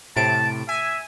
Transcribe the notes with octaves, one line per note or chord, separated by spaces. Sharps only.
A2 C3 A5 D7
E5 G#5